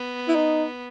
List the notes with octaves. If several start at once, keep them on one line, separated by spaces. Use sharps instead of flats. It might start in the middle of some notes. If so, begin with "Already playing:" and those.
Already playing: B3
E4
D#4